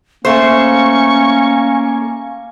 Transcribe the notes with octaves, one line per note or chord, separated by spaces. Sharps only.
A3 A#3 C#4 C5 C#6